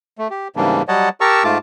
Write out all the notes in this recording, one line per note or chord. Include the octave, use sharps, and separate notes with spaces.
A3
G4
G#2 C#3 E3 G3 A#3 D4
F#3 G3 C#5 D#5 F#5 A5
G4 A#4 A5 A#5 C#6 E6
G#2 A3 F4 A5 D6